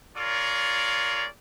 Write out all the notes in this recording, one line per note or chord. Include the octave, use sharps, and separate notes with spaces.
F4 G#4 A#4 C#5 D5